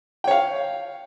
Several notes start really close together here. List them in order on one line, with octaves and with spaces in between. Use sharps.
G5 C#5 F5